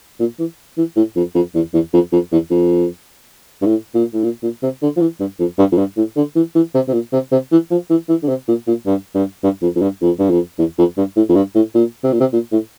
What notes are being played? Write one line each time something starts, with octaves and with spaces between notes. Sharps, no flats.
A#2
E3
E3
A2
F2
F2
E2
E2
F2
F2
E2
F2
G2
A2
A#2
A2
A#2
A#2
C3
D3
F3
E3
G2
F2
G2
F2
G2
A2
D3
E3
E3
C3
C3
A#2
C3
C3
E3
F3
E3
E3
D3
C3
A#2
A#2
G2
G2
G2
F2
F2
G2
F2
G2
F2
E2
F2
G2
A2
F2
G2
A2
A#2
C3
A#2
C3
A#2
A2